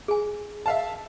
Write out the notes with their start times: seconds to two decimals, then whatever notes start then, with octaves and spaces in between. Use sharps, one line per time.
0.08 G#4 G#5
0.66 E5 F5 A5